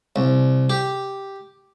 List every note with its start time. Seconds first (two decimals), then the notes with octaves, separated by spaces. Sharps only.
0.16 C2
0.70 G4